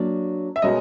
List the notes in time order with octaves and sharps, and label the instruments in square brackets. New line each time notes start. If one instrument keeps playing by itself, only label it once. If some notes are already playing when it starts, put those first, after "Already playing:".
Already playing: [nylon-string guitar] F#3 A#3 D4
[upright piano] E5
[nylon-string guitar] B2 G#3 C#4 F#4 A#4 [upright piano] D#5